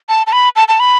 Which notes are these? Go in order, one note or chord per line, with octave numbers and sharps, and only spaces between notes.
A5
A5
B5
A5
A5
B5